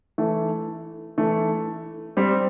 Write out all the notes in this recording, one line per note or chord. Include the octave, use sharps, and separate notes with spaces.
E3 A3
E3 A3
G3 C4